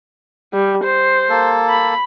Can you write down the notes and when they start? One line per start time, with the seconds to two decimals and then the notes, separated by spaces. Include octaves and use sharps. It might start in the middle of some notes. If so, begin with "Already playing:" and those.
0.53 G3
0.84 C5
1.30 A#3 A4
1.69 B5